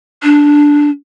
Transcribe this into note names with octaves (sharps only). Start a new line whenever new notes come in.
D4